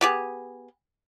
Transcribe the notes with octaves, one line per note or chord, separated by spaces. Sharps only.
B3 G4 G#4